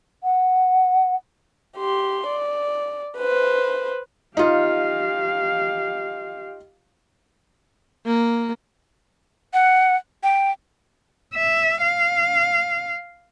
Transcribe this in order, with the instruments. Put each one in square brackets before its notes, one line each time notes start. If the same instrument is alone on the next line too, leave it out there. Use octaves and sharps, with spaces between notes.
[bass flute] F#5
[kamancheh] G4 C6
D5
B4 C5
[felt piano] D#4 F4 [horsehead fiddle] G4 F5
[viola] A#3
[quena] F#5
G5
[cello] E5
F5